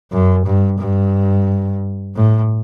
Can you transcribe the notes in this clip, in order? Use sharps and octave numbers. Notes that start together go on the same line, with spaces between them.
F#2
G2
G2
A2